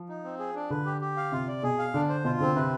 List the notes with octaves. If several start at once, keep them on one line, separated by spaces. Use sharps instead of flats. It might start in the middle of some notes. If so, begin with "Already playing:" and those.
Already playing: F3
D#4
C4
G#4
D4
D3 B4
G4
G4
F5
C3 F4
D5
B2 G#4
F5
D3 D4
C5
B2 F4
D3 C4
C3 B4